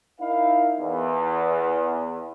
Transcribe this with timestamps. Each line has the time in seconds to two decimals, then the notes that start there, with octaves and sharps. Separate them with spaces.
0.20 D#4 E4 A#4 F5
0.80 E2